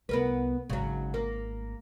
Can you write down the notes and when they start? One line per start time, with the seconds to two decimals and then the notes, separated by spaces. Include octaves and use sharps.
0.09 C2 B3 A#4 B4
0.70 G#1 C#3 F#3
1.14 A#3